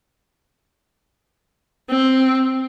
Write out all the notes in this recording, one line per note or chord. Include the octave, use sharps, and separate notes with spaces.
C4